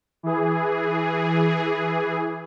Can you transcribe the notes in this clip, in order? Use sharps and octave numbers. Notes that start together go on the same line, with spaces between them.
E3 G#4